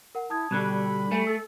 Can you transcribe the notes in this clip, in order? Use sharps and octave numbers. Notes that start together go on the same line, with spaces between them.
A#4 F#5
E4 A5 D#6 G#6
B2 D3 G3 B5 F#6 G#6
A3 G#5
A4 E6